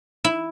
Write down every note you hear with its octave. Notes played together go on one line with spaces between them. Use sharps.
E4